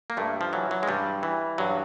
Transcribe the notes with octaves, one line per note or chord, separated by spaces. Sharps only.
A#3
G2 A3
F3
E3 F#3
F#3
G#3
G2 G3
E3
G2 F#3